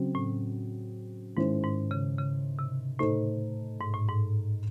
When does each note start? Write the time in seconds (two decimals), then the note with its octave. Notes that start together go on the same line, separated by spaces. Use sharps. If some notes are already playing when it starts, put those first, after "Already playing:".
Already playing: C#3 F#3 C4
0.15 A2
1.36 G#2 D#3 G#3 C#4 E4 C5
1.64 G#2
1.91 C#3
2.18 C#3
2.59 C3
2.99 A2 A3 D#4 A4 C5
3.81 G#2
3.94 A2
4.08 G#2